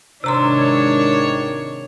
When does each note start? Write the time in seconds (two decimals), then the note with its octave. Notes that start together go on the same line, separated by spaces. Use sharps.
0.24 G#1 C3 D#3 D4 C#5 A#5 C6